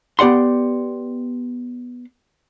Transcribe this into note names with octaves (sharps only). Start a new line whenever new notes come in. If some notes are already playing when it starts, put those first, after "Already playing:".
B3 G4 D5 F#5 C6